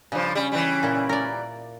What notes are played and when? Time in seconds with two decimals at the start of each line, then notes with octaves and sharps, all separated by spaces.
0.12 G2 C#3 F3
0.35 G3 C#4
0.52 E3 G3
0.83 A#2 E4
1.09 A#4 D5